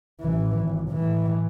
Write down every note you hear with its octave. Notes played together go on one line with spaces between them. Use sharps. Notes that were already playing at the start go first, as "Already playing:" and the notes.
A1 E3
G#1
A2 E3